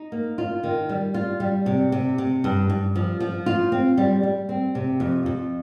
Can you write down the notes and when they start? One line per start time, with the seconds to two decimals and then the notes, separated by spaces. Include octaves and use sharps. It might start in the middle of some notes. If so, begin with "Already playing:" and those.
Already playing: D#4
0.12 A#3
0.38 F4
0.63 D#3
0.89 G3
1.14 F4
1.40 G3
1.66 C3
1.92 C3
2.18 C3
2.44 G2
2.70 G2
2.95 F3
3.20 F3
3.46 F4
3.72 C4
3.98 G3
4.23 G3
4.49 C4
4.75 C3
5.00 F2
5.26 F2